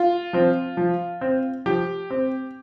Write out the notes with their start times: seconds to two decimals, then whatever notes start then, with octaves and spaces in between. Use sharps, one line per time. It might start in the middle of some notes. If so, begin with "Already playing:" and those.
Already playing: F4
0.33 F3 C4
0.77 F3
1.21 C4
1.66 F3 G4
2.10 C4